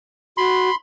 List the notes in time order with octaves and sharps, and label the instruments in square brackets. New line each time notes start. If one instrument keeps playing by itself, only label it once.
[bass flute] F#4 [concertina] B5 C6